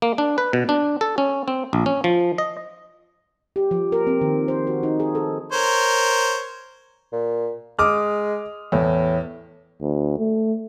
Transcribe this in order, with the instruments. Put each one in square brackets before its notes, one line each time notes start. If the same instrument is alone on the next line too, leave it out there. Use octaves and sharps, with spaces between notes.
[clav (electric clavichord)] A#3
D4
B4
B2
D4
A4
C#4
C4
A#1
C#4
F3
D#5
[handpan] G4
F3
A#4
C4
D#3
C5
F#4
D#4
G#4
A4
[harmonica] A#4 C5 C#5
[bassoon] A#2
[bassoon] G#3 [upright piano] D6 D#6 F6
[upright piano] E2 [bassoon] A2
[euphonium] D2
A3